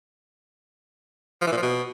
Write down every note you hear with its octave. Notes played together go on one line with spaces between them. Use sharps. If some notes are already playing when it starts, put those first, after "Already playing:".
F3
E3
A#2
F3
B2